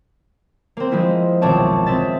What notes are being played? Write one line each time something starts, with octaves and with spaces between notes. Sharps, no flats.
A#3 C4
F3 G#3 A#3 E4
D#1 B1 C4 C#5 A5 D6
C#3 C4 E5 A6